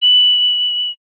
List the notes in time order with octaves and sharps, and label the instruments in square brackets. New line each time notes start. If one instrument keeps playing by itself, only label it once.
[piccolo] F#7